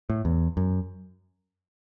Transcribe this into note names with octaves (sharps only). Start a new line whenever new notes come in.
A2
E2
F#2